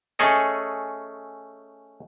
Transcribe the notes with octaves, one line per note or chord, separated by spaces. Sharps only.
A3 C#4 G#4 A4 D#5